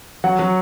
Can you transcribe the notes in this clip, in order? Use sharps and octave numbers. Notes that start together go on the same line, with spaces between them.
F#3 F#5
F#3